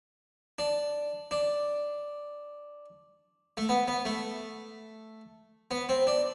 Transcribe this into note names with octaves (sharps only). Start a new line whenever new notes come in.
D4
D4
A3
B3
B3
A3
B3
C4
D4